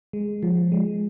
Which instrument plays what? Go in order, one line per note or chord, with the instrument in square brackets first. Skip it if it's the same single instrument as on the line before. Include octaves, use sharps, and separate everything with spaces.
[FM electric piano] G#3
F3
G#3